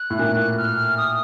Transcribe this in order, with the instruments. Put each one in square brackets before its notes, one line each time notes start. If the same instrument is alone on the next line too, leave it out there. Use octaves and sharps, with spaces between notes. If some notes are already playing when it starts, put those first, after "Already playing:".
Already playing: [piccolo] F#6
[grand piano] A2
A#2
[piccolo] F6
D#6